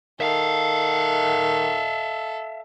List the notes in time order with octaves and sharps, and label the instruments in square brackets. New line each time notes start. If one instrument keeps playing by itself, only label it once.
[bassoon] D#3 [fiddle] A4 [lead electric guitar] E5 F5